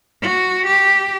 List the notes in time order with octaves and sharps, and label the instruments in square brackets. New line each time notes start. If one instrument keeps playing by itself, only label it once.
[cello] F#4
G4